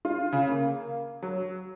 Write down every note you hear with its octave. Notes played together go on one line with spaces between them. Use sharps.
F4
C#3
A#3
F#3